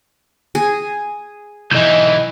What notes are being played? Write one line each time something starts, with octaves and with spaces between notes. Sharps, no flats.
G#4
B1 E3 E4 D#5 G6